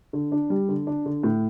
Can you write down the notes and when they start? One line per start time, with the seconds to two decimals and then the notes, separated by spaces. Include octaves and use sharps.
0.13 D3
0.32 D4
0.50 G3
0.68 D3
0.87 D4
1.06 D3
1.23 A2